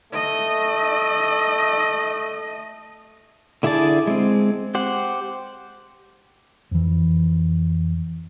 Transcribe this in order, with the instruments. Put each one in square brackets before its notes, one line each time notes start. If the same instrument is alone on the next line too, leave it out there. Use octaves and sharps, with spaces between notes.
[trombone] A3 [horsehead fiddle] D#5
[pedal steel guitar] D3 E4 G#4 D5 A5
G#3 C4
G4 C5 F#5
[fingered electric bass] F2 E3